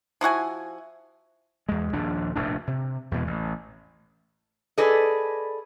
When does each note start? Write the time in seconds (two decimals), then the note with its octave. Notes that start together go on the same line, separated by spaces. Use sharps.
0.21 F3 E4 F#4 G#5
1.69 E2 G#3
1.93 A#1 D#2 F3 D4
2.36 F1 A#1 A2 D4
2.67 C3
3.11 E2 B2 G#3
3.27 A1
4.78 G#4 A4 B4 D5 D#5